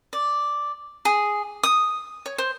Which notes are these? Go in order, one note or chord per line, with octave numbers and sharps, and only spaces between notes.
D5
G#4
D#6
C#5
C5